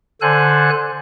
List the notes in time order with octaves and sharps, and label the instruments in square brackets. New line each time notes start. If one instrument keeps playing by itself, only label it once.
[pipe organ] D3 A4 C5 G#5 F#6